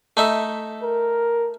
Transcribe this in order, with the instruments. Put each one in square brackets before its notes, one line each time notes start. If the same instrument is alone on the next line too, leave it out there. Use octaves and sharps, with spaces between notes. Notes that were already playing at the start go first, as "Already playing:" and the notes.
[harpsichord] A3 D#4 E5
[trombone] A#4